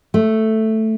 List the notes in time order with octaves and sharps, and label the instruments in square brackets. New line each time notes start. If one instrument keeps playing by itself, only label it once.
[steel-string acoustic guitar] A3